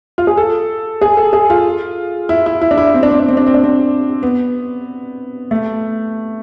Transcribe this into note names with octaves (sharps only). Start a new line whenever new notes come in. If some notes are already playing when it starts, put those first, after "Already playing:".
F4
G#4
A4
G#4
A4
G#4
F4
E4
E4
E4
D4
E4
C4
D4
C4
D4
C4
D4
C4
D4
C4
B3
A3